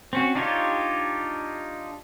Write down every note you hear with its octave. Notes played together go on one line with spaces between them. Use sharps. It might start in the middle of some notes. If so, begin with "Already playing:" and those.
C4 C#4 F#4
D4 D#4 F4 G4 C#5